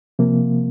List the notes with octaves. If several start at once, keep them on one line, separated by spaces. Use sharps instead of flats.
C3 F3 A#3